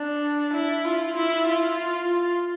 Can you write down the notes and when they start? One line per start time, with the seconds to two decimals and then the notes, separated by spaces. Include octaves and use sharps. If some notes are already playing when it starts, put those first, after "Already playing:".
Already playing: D4
0.54 E4
0.85 F4
1.17 E4
1.48 F4